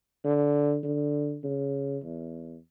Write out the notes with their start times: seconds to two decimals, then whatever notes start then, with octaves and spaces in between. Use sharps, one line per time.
0.24 D3
0.84 D3
1.44 C#3
2.04 E2